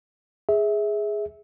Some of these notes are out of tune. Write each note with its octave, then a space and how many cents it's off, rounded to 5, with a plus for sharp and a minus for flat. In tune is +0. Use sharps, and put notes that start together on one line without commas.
G#4 +0 E5 -20